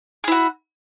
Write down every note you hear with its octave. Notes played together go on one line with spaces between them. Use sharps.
E4 F#4 G#4